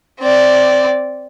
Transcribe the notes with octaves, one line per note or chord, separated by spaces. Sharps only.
C4 D5